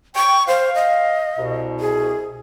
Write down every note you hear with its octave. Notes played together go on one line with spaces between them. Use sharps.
G5 C#6
C5 F5
D#5
C2 B2
G#4